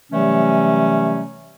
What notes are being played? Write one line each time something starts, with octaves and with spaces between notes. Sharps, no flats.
C3 E3 F#3 G3 A3 C#4